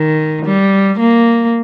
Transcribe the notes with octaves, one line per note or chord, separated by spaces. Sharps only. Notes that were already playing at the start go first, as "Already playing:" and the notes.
Already playing: D#3
G3
A#3